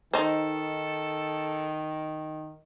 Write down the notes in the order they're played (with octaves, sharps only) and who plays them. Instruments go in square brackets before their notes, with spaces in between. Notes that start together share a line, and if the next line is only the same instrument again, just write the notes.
[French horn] D#3 [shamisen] D#4 C5 [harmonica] A4